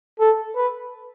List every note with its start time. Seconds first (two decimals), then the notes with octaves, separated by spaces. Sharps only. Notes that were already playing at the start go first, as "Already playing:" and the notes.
0.20 A4
0.56 B4